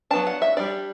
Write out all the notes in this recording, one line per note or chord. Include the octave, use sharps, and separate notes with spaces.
F#3 B3 D4 A5
F#5
E5
G3 D4 D5